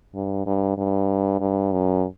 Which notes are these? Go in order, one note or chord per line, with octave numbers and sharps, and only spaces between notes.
G2
G2
G2
G2
F#2